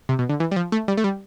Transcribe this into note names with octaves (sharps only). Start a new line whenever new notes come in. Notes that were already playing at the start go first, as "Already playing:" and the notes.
C3
B2
D3
E3
G3
F3
A3
G3
A3
G3